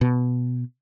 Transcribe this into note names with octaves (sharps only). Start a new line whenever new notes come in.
B2